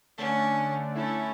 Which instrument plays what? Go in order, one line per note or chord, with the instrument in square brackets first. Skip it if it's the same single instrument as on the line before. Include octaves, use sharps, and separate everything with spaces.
[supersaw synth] D3 A3 D4 [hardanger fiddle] C#4
[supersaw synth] A3 E4 A4 [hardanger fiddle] C#4